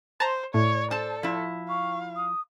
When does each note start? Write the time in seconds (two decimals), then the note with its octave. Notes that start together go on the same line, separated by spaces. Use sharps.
0.20 C5 A5 A#5 C6
0.54 A2 C#5 D5
0.91 A4 C5 A5
1.23 F3 E4
1.68 F5 C#6
2.16 D#6